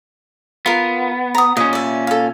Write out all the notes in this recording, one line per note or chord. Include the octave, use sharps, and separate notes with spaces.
B3 F4 A#4
A#5 D#6
A#2 C#4 D#5
D5 E5
A4 F5